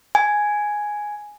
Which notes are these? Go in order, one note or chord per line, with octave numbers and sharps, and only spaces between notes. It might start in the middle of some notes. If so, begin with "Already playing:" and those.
G#5